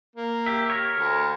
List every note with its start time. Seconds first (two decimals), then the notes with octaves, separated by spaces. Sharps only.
0.16 A#3
0.46 G4 E5
0.70 A#4 C#5
0.95 D2